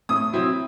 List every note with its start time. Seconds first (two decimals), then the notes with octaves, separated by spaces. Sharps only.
0.09 A2 D#6
0.33 F#3 C4 E4